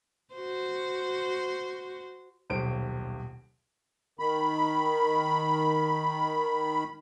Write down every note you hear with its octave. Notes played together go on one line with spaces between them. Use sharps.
F#4 C5
D#1 B1 C5 D7
D#3 B5